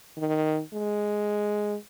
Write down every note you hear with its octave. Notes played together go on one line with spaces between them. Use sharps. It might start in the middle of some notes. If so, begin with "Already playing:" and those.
D#3
G#3